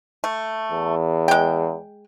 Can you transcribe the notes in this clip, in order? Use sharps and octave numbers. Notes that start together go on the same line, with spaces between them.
A3
E2
G#3 G5